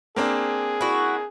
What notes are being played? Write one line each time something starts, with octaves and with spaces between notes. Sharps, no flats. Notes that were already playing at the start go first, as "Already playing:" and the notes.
A#3 C4 D4 G#4
E4 F#4